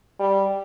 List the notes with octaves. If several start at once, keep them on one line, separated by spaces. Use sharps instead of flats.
G3